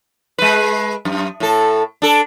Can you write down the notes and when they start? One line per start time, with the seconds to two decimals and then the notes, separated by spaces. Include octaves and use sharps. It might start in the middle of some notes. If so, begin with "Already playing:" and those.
0.38 G#3 B4
1.05 F#2
1.40 A2 A4
2.02 D4 A4